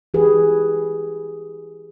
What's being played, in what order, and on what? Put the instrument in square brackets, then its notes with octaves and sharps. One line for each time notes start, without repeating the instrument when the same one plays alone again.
[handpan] E3 G4 G#4 B4